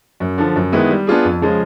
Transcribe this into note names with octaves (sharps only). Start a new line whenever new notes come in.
F#2
D3 F3
F#2
D#3 G#3 B3 E4
G3
B3 D4 F4 G#4
F2
C#3 F3 G#3